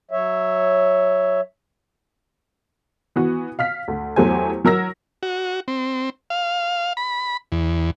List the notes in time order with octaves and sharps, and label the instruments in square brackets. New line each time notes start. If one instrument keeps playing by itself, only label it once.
[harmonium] F#3 C#5 E5
[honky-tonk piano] E3 B3 F#4
F5 F6 B6
D2
E2 F#3 A3 G4 C5 G#5
F#3 A#4 E6 A#6
[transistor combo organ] F#4
C4
F5
B5
E2